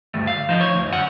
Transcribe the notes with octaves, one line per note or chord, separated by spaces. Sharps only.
D2 G2 A3
F5
F3 D#4
C#5
D2
F#2 F#5